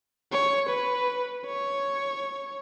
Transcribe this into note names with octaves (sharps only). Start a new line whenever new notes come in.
C#5
B4
C#5